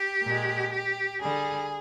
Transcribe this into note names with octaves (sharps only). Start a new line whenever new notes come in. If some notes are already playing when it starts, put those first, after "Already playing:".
Already playing: G4
A#2 G#3
G4
D3 G3 G#4